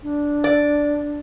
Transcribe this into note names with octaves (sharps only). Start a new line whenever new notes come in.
D4
D5